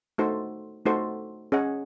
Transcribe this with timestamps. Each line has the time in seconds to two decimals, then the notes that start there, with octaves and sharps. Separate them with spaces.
0.18 A3 D#4 F#4 A4 C5
0.85 A3 D#4 F#4 A4 C5
1.52 C#4 G#4 D#5 F#5